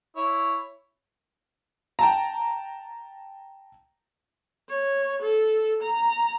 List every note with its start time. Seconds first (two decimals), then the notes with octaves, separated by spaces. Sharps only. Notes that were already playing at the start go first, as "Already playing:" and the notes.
0.17 E4 C#5
1.99 G5 A5 A#5
4.69 C#5
5.22 A4
5.82 A#5